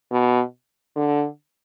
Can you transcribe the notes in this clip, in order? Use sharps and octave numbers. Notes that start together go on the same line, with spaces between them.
B2
D3